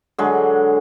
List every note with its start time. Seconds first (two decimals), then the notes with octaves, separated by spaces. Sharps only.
0.19 D3 F#3 G#3